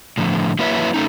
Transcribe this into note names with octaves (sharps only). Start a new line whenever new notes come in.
A2 D3 F3
F#3 A#3 E4 B4 C#5 E5
A3 C#4 D#4